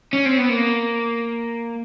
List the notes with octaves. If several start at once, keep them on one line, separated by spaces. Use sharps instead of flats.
C#4
C4
B3
A#3